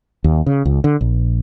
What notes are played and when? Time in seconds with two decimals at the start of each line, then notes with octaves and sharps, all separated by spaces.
0.24 D#2
0.46 C#3
0.65 C#2
0.84 D3
1.01 A#1